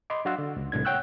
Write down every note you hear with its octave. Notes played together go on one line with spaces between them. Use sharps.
D#5 B5 C6 D6
F#3 D4 F#4 F5 C6 E6
D3
C#2
C2 A2 B3 D4 G#6
C#5 F#5 G5 C#6 E6 F#6